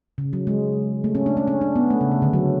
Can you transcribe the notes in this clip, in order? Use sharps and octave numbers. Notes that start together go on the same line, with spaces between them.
C#3
F#3
G#3
A3
C#4
D4
C#4
C#4
D4
B3
A3
C#3
C#3
D3
F#3